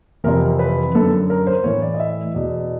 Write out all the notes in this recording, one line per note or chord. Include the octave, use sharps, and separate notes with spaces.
F2 C3 E3 A#4
B4
F#2 D3 A4
A#4
C5
A2 E3 C#5
D5
D#5
E5
E2 B2 D5